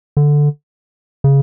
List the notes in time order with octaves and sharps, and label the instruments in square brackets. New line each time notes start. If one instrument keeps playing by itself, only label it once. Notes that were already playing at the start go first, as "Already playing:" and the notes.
[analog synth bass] D3
C#3